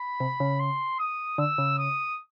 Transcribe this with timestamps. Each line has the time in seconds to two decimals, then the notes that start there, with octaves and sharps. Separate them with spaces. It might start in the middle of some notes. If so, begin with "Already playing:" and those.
Already playing: B5
0.20 C3
0.40 C#3
0.59 C6
0.99 D#6
1.38 D3 E6
1.58 C#3
1.78 D#6